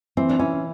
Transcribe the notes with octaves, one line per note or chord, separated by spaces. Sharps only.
E3 C4
D4
E3 C#4